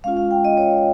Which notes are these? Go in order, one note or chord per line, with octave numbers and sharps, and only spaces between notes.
G#3 C#4 F4 F5
F5
G5
D#5
C#5